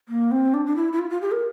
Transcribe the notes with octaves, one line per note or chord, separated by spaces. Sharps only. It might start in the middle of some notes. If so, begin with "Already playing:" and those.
A#3
C4
D4
D4
E4
E4
F4
F4
G4
A#4